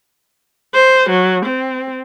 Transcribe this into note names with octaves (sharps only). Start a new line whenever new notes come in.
C5
F#3
C4